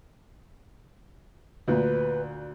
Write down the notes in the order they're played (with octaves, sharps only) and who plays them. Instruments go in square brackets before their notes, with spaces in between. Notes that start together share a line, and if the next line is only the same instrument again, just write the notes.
[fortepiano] D2 A#2 [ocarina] B4